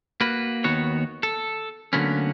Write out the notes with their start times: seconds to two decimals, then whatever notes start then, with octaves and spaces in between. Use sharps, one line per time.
0.21 A#3 F#4 B4
0.64 D#2 D#3 B3 F#4 C#5
1.23 A4
1.93 D2 D3 F#3 A#3 B3 C#4